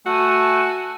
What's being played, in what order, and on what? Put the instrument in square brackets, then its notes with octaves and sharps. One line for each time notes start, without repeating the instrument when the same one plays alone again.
[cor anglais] A3 [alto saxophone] F#4 [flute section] G#5 A5